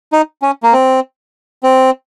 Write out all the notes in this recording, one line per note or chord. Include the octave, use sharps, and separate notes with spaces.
D#4
C#4
A#3
C4
C4